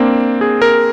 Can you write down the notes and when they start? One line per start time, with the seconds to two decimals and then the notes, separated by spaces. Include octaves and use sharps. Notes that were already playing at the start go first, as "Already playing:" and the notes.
Already playing: A#3 C4 D4
0.41 G#4
0.62 A#4